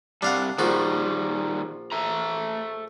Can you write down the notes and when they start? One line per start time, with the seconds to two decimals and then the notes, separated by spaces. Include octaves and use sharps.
0.22 C3 G3 D4 F5 F#5
0.59 A#1 D#3 F3 G3 F#4
1.92 A4 E5 A#5